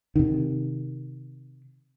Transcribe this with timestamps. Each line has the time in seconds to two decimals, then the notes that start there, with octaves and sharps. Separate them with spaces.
0.16 C3 D#3